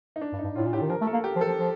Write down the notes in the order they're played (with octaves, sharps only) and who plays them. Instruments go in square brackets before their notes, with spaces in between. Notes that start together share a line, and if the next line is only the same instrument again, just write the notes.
[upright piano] D#4
D4
[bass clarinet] G2
[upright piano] D#4
[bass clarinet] G2
[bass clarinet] A2 [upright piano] F4
[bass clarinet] A#2
[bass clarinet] A2 [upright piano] G4
[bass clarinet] D#3
[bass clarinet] F3 [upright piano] A#4
[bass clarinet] A3
[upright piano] A4
[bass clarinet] A#3
[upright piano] G4
[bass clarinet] F3
[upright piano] A4
[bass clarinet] F3
F3